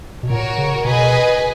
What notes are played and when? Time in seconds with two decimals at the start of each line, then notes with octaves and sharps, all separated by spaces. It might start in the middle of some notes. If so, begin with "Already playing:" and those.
0.23 B2
0.30 A#2 F#4 A#4 C#5
0.58 C#3
0.85 B2 G#4 B4 D#5 G#5